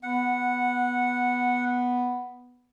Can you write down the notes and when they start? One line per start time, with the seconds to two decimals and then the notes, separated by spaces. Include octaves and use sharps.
0.03 B3 F#5